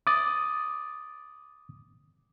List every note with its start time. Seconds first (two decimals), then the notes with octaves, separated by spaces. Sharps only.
0.07 D6 D#6 A6